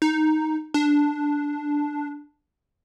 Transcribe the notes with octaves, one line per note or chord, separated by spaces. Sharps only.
D#4
D4